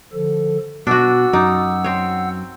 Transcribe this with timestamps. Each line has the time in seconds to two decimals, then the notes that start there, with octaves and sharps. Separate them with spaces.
0.13 D3 F3 A4
0.87 B2 D4 F#4 F#5 E6
1.33 F#2 D#4 D5
1.84 C4 C#5